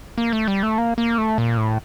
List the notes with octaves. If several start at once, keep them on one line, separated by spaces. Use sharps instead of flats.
A#3
A3
G3
A3
A#3
A#3
A3
A#2
A2